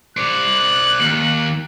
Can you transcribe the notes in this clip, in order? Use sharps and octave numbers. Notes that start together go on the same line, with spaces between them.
C5 D5 F#6
D#2